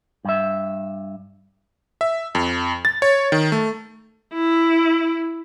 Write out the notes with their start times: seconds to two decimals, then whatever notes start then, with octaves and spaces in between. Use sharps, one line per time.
0.25 G2 E5
2.01 E5
2.35 F2
2.85 A6
3.02 C#5
3.32 D#3
3.52 A3
4.33 E4